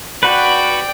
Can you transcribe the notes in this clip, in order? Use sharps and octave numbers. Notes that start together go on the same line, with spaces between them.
F#4 B4 D5 G5